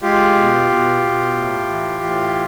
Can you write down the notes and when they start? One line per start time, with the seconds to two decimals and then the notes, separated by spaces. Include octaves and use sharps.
0.02 G#3 F4 G4
0.35 B2
0.69 B2
1.02 B2
1.36 A2
1.69 E3
2.02 A2